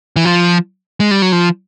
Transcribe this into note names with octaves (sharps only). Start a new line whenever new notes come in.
E3
F3
G#3
G3
F#3
F3